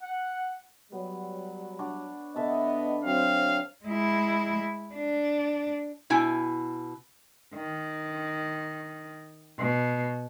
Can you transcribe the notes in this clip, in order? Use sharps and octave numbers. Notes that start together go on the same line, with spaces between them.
F#5
F#3 G3 B3
D4 C#5 F#5
D3 B3 D#5 E5 A5
F#3 C4 F5
G#3 E4
D4
B2 E4 G#5
D#3
B2